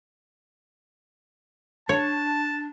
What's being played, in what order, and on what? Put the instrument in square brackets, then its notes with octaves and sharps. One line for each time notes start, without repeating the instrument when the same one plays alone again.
[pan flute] D4 [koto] C#5 [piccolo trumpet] A5